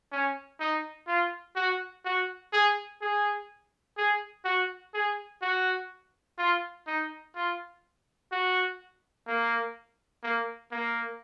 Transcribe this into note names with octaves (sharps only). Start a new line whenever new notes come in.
C#4
D#4
F4
F#4
F#4
G#4
G#4
G#4
F#4
G#4
F#4
F4
D#4
F4
F#4
A#3
A#3
A#3